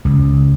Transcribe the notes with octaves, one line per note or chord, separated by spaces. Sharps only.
C#2